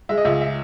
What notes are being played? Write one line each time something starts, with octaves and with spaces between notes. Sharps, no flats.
G#3 E5
D#5
C#2 E5
E5